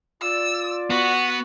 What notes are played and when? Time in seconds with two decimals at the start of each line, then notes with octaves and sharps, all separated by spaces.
0.22 F4 D5 E6
0.90 B3 F#4